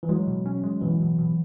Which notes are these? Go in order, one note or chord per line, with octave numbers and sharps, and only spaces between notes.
E3
F#3 G#3
B2
C#4
G#3
B2 E3
B2
B2